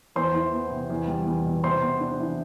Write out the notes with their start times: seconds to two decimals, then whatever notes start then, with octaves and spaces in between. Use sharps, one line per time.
0.16 E2 C5 C6
0.35 E3
0.53 B3
0.71 C3
0.90 E2
1.08 G3
1.26 E2
1.45 B2
1.63 C3 C5 C6
1.82 B3
2.00 D4
2.20 E3